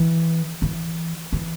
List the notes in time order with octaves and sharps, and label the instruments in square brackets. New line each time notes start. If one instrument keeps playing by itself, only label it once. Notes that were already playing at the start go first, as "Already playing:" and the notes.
Already playing: [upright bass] E3
E3
E3